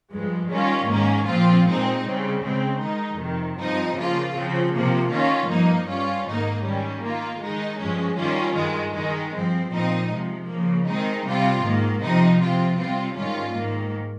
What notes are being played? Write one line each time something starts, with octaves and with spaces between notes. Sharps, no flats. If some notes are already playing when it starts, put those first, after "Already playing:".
G2 F3 G#3
D#3 G3 C#4 F4
G#2 D#3 A#3 C#4
A#2 F3 C4 F4
A#2 G#3 C4 D#4
C#3 G3 C4
C#3 G#3 C4
D#3 G#3 D#4
F2 C3 D#3
G2 F3 C4 D#4
C#3 F3 A#3 F4
C#3 F3 C4
C3 F3 A#3
D#3 A#3 C#4 F4
G2 F3 A#3 D#4
G2 G3 C#4 F4
G#2 D#3 A#3 D#4
D#3 G3 C#4
D#3 A#3 F4
D#3 G#3 D#4
G2 F3 G#3 C#4
D#3 G3 C#4 F4
G2 D#3 G#3
D#3 G#3 D#4
G2 F3 C4
A#2 F3 C4 D#4
C3 F3 G#3
C#3 F3 A#3
D#3 G#3 C4 D#4
C3 G3 C4 F4
G#2 D#3 A#3
C3 F3 C4 D#4
C3 F3 C4 F4
C3 G3 C4 F4
G#2 D#3 G3 C#4 F4
G#2 D#3 A#3